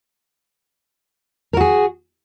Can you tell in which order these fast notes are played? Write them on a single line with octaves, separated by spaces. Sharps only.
A#4 F#4 G#4